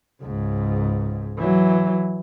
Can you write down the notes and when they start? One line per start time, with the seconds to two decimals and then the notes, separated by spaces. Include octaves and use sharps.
0.22 C#2 G#2
1.38 E3 F#3